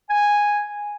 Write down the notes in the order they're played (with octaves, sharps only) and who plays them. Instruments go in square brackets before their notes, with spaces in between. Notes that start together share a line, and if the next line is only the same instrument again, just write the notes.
[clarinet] G#5